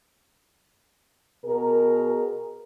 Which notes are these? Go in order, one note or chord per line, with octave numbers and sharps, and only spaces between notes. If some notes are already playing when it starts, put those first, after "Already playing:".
B2 G#4 A#4